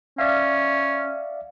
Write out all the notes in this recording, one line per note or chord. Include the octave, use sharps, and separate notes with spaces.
C#4 D5 E5 F5